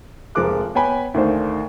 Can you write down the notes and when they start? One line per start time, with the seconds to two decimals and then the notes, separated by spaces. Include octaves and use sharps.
0.35 F1 F3 G#3 A#4 D6 F#6
0.75 B3 C#5 G5 G#5 B5
1.14 D2 D#3 A3 D4 C5 F5